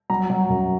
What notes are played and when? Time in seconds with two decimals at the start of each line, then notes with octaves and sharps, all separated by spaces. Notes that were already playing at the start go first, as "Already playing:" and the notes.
0.10 F#3 A#5
0.30 F#3
0.49 F#2